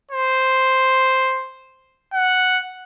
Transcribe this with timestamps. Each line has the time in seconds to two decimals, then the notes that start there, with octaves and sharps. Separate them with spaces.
0.11 C5
2.14 F#5